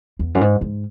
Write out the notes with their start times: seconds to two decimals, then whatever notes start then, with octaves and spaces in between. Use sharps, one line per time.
0.19 E2
0.35 F#2
0.41 G#2
0.61 G#2